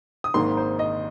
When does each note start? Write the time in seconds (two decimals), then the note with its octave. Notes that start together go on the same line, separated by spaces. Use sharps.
0.24 D#6
0.34 G#1 G#2 D#3 A#3 C6
0.57 C5
0.79 D#5